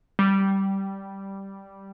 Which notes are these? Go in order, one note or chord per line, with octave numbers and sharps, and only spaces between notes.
G3